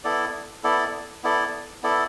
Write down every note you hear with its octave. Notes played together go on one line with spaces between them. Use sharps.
B3 E4 A4 D5
B3 E4 A4 D5
B3 E4 A4 D5
B3 E4 A4 D5